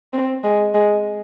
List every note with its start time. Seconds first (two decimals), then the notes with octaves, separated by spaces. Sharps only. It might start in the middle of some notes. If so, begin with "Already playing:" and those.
0.14 C4
0.44 G#3
0.74 G#3